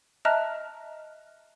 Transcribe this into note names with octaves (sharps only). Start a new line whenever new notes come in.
D#5 E5 A5 A#5 F6 F#6